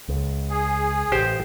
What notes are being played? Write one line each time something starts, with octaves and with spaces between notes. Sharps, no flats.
C#2
G#4
A1 G4 C5